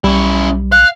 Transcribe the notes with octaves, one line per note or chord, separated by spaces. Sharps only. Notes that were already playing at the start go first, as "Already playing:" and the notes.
B1 G3 C#4 E4
F5 F#6